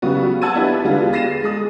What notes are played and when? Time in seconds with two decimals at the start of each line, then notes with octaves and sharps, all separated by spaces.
0.02 C#3 F#3 G3 B3 F#4
0.42 F#5 A5 E6 G#6 A6 D#7
0.55 B3 D4 E4 G4
0.84 D3 G3 G#3 B3 F4
1.13 A6 A#6 C7 D#7 E7
1.44 G#3 D#6